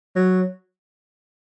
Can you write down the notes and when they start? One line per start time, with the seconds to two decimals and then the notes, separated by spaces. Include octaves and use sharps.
0.16 F#3